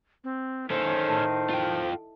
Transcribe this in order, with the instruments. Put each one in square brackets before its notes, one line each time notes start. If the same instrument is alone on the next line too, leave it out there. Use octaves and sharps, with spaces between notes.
[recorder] C4
[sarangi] D#3 [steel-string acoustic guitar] A#3 E4 [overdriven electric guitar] C#4 A4 [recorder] C5
[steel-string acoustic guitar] A2
[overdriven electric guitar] F4 G5